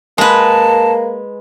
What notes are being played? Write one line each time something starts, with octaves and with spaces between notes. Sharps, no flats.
G#3 A#3 B4 A5